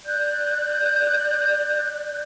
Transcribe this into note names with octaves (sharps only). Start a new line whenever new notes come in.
D5 F#6 G6